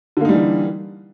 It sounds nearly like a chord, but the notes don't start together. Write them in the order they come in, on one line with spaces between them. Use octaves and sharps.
D3 A#3 D#4 G3 E3